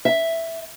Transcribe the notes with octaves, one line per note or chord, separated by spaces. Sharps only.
E5